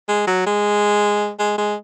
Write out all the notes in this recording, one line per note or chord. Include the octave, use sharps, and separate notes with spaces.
G#3
F#3
G#3
G#3
G#3